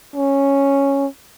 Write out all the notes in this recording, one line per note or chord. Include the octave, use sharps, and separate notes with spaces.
C#4